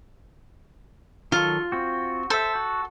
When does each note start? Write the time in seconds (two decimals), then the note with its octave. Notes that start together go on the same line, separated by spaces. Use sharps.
1.32 D#3 F#3 F4 A4
1.72 C4 F#4
2.30 A4 C5 E5
2.55 F#4